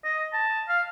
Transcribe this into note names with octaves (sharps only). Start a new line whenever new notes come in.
D#5
A5
F5